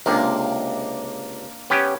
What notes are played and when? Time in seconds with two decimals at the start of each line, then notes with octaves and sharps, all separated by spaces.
0.06 C#2 C3 A#3 D4 A#4
1.70 B3 C#4 G4